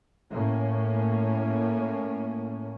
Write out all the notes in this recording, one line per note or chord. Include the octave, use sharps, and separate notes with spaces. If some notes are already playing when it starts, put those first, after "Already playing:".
A2 A#3 C#4